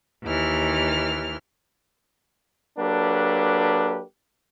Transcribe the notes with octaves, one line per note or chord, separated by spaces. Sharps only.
D#2 E3 F6
F#3 A#3 D4 G4 A4 B4